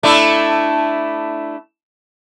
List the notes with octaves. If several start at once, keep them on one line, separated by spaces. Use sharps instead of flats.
A3 D4 E4